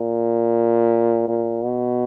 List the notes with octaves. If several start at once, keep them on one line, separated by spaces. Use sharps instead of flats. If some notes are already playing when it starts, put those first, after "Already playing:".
Already playing: A#2
A#2
B2